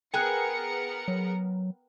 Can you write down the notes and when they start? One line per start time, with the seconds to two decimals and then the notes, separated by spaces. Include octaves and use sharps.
0.14 B3 G#4 A#4 G5 G#5 F#6 C#7
1.08 F#3